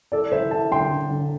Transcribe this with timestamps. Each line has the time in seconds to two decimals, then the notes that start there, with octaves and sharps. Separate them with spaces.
0.12 E4 A4 D5
0.32 E4 C5 E5
0.51 E4 E5 A5
0.71 D3 G5 C6
0.90 D3
1.10 D3